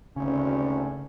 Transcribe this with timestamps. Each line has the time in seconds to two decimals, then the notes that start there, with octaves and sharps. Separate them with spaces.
0.16 G#1 D2 C#3 C#4